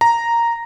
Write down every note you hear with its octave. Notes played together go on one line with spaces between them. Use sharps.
A#5